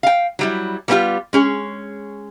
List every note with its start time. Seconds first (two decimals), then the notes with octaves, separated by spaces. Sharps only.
0.03 F5 G5
0.39 F#3 G3 E4
0.88 G3 A#3 B3 C#4 F4 G4
1.33 G#3 C#4 G#4